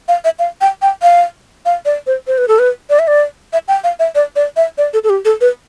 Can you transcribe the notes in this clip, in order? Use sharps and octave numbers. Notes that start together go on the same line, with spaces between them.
F5
E5
F5
G5
G5
F5
F5
D5
C5
C5
B4
A4
B4
D5
E5
D5
E5
G5
F5
E5
D5
D5
E5
D5
A4
A4
G4
A4
B4